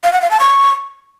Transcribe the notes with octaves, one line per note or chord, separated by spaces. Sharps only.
F5
F#5
F5
A5
C#6